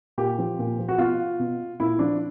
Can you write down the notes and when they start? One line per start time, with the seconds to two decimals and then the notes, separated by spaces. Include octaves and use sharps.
0.18 A#2 G4
0.39 F3
0.59 A#2
0.79 F3
0.89 F#4
0.98 B2 F4
1.39 B2
1.80 A#2 E4
1.99 F3 D4